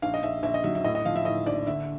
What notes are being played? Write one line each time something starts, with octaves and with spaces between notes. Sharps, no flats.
A#1 F5
D#5
A#1 E5
A#1 E5
D#5
F#3 E5
E5
A2 D#5
D#5
F3 F5
E5
A2 D#5
A#1 D5
D3 E5